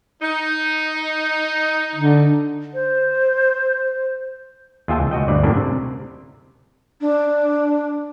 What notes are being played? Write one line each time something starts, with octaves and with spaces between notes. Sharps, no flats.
D#4
D3
C5
D#2 F4 G#4 E5 G5 A5
C#2
C#2 F#4 D#5 G5
D2 G2 D5
F#2 A2 C#3 A#3 D4
C3
D4